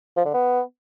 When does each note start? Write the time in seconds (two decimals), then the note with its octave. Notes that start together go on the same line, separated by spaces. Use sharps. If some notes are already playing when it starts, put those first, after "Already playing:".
0.17 F3
0.25 D3
0.34 B3